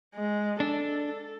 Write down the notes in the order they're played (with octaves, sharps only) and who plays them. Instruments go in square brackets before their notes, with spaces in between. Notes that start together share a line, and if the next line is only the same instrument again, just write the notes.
[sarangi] G#3
[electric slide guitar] D4 [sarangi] A4